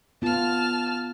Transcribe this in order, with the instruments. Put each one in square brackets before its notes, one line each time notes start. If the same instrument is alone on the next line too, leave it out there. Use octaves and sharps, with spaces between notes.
[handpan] B3 F4 [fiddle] A5 F6